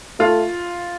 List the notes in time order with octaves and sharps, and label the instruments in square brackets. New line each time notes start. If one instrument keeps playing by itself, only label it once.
[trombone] A3 [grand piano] F4